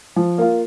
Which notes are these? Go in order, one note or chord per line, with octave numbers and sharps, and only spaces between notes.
F3
A#3 F4